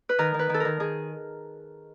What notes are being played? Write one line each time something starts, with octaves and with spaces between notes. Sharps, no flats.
B4
D#3 A#4
D#3
B4
D#3 A4
D#3 A#4
D#3 G#4